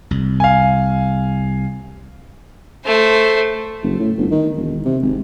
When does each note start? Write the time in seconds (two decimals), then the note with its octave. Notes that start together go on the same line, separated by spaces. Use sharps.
0.11 C2
0.40 F5 G#5
2.84 A3 C5
3.83 F#1
3.99 A2
4.18 G1
4.31 D#3
4.56 E1
4.85 C3
5.02 G#1